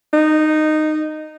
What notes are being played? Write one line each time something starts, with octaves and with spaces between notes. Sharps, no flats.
D#4